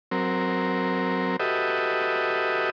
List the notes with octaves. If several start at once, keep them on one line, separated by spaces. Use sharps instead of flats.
F#3 C4 A#4
F#4 G4 A4 B4 D#5 E5